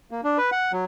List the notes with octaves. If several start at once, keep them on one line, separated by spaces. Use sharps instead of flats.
A#3
D4
B4
F#5
F#3